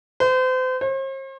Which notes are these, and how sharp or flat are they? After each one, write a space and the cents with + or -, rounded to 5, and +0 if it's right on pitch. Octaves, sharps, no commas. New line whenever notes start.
C5 -35
C5 +45